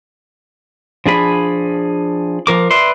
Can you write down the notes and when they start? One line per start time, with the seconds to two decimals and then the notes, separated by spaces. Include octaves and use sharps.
1.06 F3 D4 G#4 B5
2.47 F3 A#4 D6
2.71 B4 D5 E5 C6